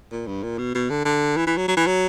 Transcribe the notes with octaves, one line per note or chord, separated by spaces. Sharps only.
A#2
G2
A#2
B2
B2
D3
D3
E3
E3
F#3
F#3
E3
F#3